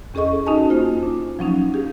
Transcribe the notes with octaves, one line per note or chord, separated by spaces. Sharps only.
E2 C#4 G#4 A4 D#5 C#6
C#4 D#4 F#4 D#5 G#5 A5
A#3 F4 C5
D4
F3 F#3 C#4 D#4
G4 G#4